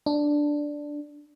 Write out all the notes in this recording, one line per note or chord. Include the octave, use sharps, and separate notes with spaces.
D4